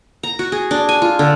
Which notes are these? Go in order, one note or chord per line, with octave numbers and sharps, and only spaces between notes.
A#5
F#4
G#4
D4
G#5
F4
D3